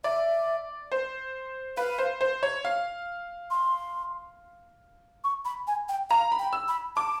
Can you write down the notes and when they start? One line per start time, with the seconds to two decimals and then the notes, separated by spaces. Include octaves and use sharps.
0.04 D5 E5
0.92 C5
1.77 B4 F5
1.98 C5
2.21 C5
2.43 C#5
2.65 F5
3.51 C6
5.24 C#6
5.45 B5
5.67 G#5
5.89 G5
6.10 F5 A#5
6.32 B5
6.39 G5
6.53 E6
6.68 B5
6.96 A5 D6